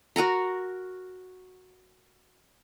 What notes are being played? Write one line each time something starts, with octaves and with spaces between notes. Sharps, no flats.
F#4 A#4 F#5 A#5